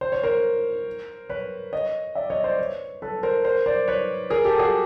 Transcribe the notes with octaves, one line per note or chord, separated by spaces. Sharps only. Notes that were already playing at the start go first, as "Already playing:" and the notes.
C5
C#5
A#4 C5
B4 C#5
C#5 D#5
D5 E5
C#5 D#5
C5 D5
B4 C#5
A4 B4
A#4 C5
A#4 C5
C5 D5
B4 C#5
G#4 A#4
G4 A4
F#4 G#4